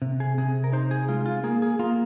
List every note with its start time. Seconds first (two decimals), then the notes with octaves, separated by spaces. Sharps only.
0.02 C3
0.20 G#4
0.38 C3 G#4
0.64 A#4
0.72 D#4 C5
0.91 G#4
1.09 G#3 F4
1.26 F4
1.44 A#3 G#4
1.62 G#4
1.79 A#3 F4